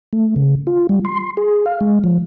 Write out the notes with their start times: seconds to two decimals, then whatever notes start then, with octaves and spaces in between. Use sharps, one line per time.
0.13 A3
0.36 C#3
0.67 F4
0.89 G3
1.05 C6
1.37 G#4
1.66 F5
1.81 G#3
2.04 F3